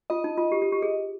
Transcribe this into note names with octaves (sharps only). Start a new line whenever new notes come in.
F4 D#5
D#4
F4
G4
G4
G4
G#4